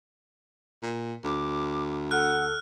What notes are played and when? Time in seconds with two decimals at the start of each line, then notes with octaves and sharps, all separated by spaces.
0.83 A#2
1.24 D2 D6
2.11 A4 F#5 F6 F#6